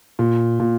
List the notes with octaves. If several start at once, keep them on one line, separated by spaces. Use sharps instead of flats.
A#2
A#2